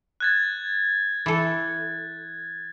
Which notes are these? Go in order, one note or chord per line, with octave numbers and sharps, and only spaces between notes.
F#6 G#6 A6
E3 A4